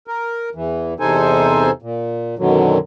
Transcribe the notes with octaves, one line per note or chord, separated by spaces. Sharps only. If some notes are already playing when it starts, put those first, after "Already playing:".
A#4
E2 E3
E2 C3 D#4 A4 C5 G#5
A#2
F#2 B2 D3 D#3 F#3